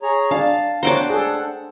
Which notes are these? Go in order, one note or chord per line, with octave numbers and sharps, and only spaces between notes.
G#4 C#5 A#5
D4 F5 A5
D4 C5 C#5 F#5 G5 A#5 D6
G#4 A4